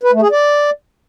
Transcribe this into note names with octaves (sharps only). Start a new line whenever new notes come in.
B4
A3
G#4
D5